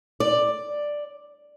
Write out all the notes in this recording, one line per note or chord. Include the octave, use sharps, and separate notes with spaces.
D5